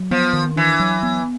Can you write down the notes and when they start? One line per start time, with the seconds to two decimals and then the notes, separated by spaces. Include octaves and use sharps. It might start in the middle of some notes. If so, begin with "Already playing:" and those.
Already playing: F#3
0.11 F3 B3
0.33 D#3
0.56 E3 D4
0.80 F#3
1.03 B3